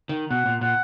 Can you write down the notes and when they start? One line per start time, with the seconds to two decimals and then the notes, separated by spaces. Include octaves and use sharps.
0.09 D#3
0.30 B2 F#5
0.46 A#2
0.61 A#2 F#5